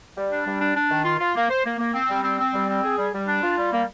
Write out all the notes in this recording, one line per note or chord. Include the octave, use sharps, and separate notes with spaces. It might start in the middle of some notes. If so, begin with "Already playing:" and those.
G3
D4
G3
D4
D4
D#3
F4
F4
A#3
C5
A#3
A#3
C4
G3
C4
C4
G3
C4
G#4
G3
G3
D4
F4
G3
A#3